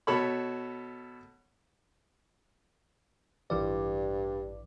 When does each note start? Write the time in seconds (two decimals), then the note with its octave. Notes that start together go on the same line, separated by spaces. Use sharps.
0.07 B2 A4 C#5 B5
3.50 A1 G2 E3 D5